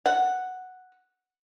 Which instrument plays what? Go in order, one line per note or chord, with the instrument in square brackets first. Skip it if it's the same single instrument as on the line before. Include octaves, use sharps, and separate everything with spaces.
[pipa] F#5